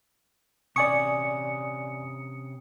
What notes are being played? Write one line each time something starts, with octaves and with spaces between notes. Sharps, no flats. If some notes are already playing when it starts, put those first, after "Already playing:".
C3 C#4 D5 G#5 C#6 D#6 C#7